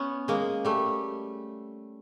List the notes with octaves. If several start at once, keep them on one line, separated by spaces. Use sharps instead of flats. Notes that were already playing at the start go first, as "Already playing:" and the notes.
Already playing: B3 C#4
G#3 A#3
G3 A3